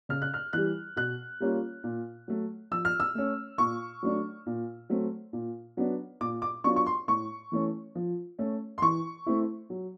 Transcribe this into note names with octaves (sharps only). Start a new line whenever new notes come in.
C#3 F6
F#6
F6
E3 G3 F#6
B2 F#6
G3 A#3 C#4 F4
A#2
F#3 A3
F3 E6
F6
E6
A3 C#4
A#2 C#6
F#3 A3 D4
A#2
F#3 A3 C4
A#2
F#3 B3 D4
A#2 D6
D6
F#3 B3 D4 F4 C#6
C#6
C6
A2 C#6
E3 A3 C#4
F3
A3 C#4
C6
E3 C#6
A3 C4 E4
F#3